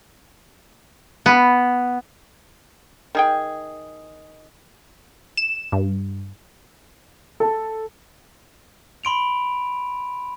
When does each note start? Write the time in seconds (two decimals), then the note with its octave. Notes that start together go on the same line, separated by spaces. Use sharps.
1.26 B3
3.15 D#3 G#4 G5
5.37 E7
5.72 G2
7.40 A4
9.04 B5 C6 D7 F7